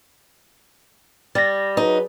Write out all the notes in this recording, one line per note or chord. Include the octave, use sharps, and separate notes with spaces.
G3 A6 A#6
F#3 D#4 G#4 B4